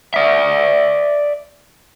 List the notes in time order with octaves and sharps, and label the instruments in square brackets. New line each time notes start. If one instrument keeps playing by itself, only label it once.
[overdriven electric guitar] D5 E5